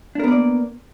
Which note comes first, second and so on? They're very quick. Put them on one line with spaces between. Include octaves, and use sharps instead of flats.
D4 A#4 B3 D5 A#3